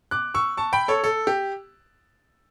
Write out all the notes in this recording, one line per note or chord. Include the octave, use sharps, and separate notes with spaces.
D6 F#6
C#6 E6
A5 C#6
G5 B5
A4 C#5
A4
G4